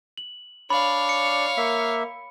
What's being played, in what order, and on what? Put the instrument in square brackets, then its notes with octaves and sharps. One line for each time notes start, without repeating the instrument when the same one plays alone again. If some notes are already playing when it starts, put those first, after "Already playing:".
[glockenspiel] F#7
[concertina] D4 D5 [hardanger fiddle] C#5 F5 [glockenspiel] B5
[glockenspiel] C#7
[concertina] A#3 E5